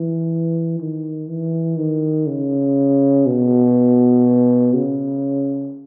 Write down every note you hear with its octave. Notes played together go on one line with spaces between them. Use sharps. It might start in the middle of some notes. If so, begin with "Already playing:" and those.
Already playing: E3
D#3
E3
D#3
C#3
B2
C#3